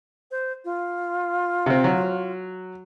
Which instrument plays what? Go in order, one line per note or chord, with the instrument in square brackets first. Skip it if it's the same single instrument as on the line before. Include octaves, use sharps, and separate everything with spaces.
[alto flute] C5
F4
[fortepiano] C3 C4
F#3